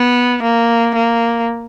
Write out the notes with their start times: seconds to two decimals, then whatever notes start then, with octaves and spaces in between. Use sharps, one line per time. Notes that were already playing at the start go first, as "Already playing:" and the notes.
Already playing: B3
0.43 A#3
0.95 A#3